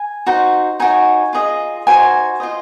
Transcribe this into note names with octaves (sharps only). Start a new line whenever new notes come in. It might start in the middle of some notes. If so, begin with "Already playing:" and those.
Already playing: G#5
D#4 F#4 C5
D#4 F#4 C#5 G#5
F4 G#4 D#5
D#4 F#4 C5 G#5
F4 C5 D#5